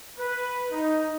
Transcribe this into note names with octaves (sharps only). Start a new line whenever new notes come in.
B4
D#4